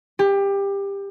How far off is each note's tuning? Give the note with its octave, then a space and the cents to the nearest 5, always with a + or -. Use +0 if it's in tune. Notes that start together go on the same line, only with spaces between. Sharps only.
G4 +20